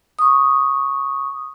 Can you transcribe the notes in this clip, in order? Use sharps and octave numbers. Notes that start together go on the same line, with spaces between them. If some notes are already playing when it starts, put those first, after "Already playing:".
C#6 D#6